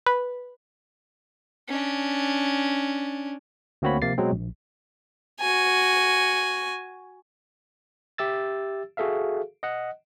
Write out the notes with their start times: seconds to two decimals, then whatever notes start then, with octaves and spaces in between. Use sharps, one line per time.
0.06 B4
1.69 C#4 D4
3.82 D2 A#3 C4 F#4 C#5 B5
4.02 C3 F3 A#3 A6 C7
4.18 B2 F#3 G#3 C4
4.32 A#1
5.41 F#4 G#5
8.18 G4 E5 E6 A6
8.97 F#4 G#4 A4 E5 F5
9.63 D#5 F#5